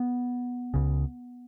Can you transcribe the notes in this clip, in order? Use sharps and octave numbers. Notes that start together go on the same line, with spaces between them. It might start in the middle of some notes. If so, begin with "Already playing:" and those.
Already playing: B3
C#2 C#3